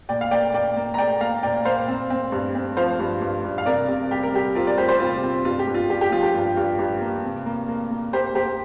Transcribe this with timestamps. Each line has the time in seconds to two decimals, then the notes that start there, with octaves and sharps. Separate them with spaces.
0.09 A#2 D5 G5
0.21 F5
0.31 A#3 D5 G5
0.53 A#3 D5 G5
0.76 A#3
0.94 A#5
0.98 A#3 D5 G5
1.21 A#3 F5 A#5
1.43 A#2 D5 G5
1.65 A#3 C5 F5
1.88 C4
2.10 C4
2.32 G2
2.55 C4
2.77 F3 C5 F5
3.00 G2
3.22 G2
3.45 G2
3.58 F5
3.66 C3 A#4 D5
3.88 C3
4.11 G3 G4
4.23 A#4
4.34 G3 G4
4.55 C4 F4 A#4
4.67 A#4 D5
4.78 G3 G4 C5
4.89 G4 C5
5.00 C3 F4
5.23 C4
5.45 G2 F4
5.59 G4
5.67 G2
5.74 F4
5.89 G2 G4
6.01 G4
6.12 F3 F4
6.23 G4
6.34 G2
6.57 G2
6.79 G2
7.01 A#3
7.24 C3
7.46 A#3
7.68 A#3
7.91 A#3
8.13 A#3 G4 C5
8.35 A#3 G4 C5